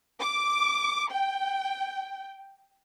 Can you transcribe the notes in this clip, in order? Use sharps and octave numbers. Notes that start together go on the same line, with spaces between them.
D6
G5